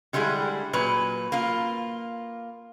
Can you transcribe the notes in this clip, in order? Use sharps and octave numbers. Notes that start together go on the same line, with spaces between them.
D3 G3 G#3 E4 G#4
A#2 F#3 B4
A#3 F4